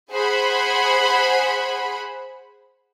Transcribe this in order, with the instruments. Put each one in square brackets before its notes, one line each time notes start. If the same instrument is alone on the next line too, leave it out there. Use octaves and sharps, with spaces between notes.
[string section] G#4 C5 F#5 B5